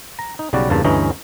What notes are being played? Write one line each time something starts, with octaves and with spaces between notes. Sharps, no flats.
A#5
D#4
B1 C#3 G3 F#4 D5
E2 G2 C#3 A#3 A5
D2 G2 E3 C#4 D#5 A#5